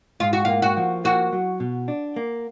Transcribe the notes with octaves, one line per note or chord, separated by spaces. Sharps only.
G#2 F4
F#4
A#3 F4
F#4
F3
A#3 F#4
F#3
B2
D4
A#3